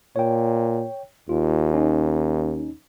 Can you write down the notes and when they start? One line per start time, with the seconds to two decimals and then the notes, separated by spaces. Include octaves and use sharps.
0.16 A#2 C#5 G5
1.29 D#2 F4
1.74 C#4 D#4